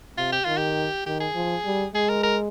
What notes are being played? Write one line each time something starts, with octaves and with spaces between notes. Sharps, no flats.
C3 F4
G4
D#3 F4
G4
D#3 G4
G#4
F3
G3
G#3 G#4
A#4
A#4